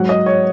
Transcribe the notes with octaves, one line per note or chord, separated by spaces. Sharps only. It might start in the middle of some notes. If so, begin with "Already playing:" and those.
Already playing: G#2 F#3 F#5
D#5
C#5